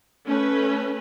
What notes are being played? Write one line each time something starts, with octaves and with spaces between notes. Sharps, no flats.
A3 C#4 B4